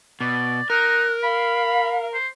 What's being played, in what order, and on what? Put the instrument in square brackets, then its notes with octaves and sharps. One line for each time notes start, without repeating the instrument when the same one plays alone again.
[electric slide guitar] B2 [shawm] D5
[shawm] D#4 [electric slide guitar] A#4 [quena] F#6
[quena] F5 [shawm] B5
[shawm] C5